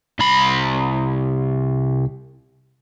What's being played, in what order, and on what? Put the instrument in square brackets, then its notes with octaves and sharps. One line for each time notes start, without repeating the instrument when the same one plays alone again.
[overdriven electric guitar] C2 B5